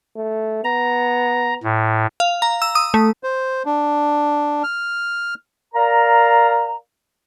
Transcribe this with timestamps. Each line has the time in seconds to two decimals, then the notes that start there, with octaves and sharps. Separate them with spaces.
0.16 A3
0.64 B3 A#5
1.63 A2
2.20 F5
2.42 A#5
2.62 E6
2.75 D#6
2.94 A3
3.23 C5
3.66 D4
4.63 F6
5.74 A#4 D5 F5 A#5